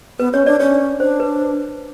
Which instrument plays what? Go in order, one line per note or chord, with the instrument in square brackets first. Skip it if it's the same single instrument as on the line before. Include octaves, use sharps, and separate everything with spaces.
[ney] B3 [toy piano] B4
[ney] C#4 [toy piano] C#5
[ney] D4 [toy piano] D5
[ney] C#4 [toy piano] C#5
[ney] D4 [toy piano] C5
[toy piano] B4